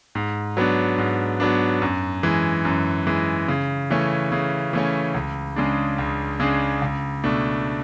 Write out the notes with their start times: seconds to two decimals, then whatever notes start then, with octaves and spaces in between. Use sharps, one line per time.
0.15 G#2
0.57 F#3 B3 D4
0.98 G#2
1.40 F#3 B3 D4
1.82 F#2
2.23 E3 G#3
2.65 F#2
3.07 E3 G#3
3.48 C#3
3.90 E3 A3 C#4
4.32 C#3
4.73 E3 A3 C#4
5.15 C#2
5.56 C#3 G#3 D4
5.98 C#2
6.40 C#3 G#3 D4
6.82 C#2
7.24 B2 A3 D4